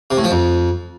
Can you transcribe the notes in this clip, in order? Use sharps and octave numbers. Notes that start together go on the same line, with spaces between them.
C3
A2
F3
F2